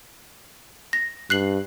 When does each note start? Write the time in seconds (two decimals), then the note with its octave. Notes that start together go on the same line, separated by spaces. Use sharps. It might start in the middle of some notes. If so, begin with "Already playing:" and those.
0.93 A#6
1.30 G2 F#6 C7 F#7